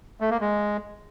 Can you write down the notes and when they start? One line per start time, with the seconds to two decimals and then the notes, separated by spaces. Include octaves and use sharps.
0.20 A3
0.31 A#3
0.41 G#3